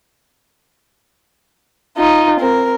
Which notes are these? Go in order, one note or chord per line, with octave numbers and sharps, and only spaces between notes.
D#4 F4
C4 A#4